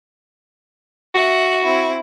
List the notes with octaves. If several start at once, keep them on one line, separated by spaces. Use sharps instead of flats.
F#4 E5 F#5
C4 E4